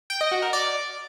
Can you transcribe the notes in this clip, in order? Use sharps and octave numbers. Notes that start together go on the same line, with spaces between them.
G5
D#5
F#4
A#4
D5